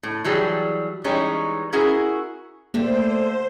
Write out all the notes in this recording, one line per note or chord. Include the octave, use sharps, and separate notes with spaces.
A2
E3 F#3 G3 G#4
E3 G3 G#3 C#4 D#4 C#5
C#4 E4 F#4 G#4 A#4
D3 A3 A#3 G4 C5